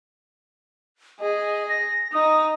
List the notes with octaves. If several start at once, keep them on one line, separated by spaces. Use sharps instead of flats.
G#4 D#5
A#6
D#4 D#6